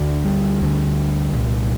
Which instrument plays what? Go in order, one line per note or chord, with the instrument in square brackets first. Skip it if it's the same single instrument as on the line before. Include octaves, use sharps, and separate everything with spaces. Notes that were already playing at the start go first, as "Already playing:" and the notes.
Already playing: [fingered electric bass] D2 D3
G3
D2 D3
C2 A#2